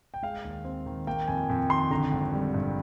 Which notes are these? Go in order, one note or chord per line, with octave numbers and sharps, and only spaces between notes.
G5
G#3 F5
D#2
C4
D#3
A#3 G5
F2 G#5
F2
D#3 C6
D3 A#5
G#1
G3
G2